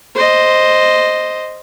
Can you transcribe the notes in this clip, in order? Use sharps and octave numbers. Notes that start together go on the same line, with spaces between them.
C5 D#5